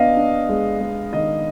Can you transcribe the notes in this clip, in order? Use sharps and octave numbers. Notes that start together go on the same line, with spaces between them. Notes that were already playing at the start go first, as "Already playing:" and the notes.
Already playing: B3 D4 D#5 F5
D4
G#3
G#3
D#3 D#5